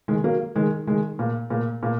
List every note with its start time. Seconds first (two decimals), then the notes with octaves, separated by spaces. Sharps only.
0.08 D#3 G#3
0.24 F#3 A#3
0.56 D#3 G#3
0.87 D#3 G#3
1.19 A#2
1.50 A#2
1.83 A#2